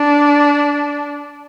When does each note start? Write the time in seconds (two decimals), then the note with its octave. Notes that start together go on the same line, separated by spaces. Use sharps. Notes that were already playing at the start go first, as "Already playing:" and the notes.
Already playing: D4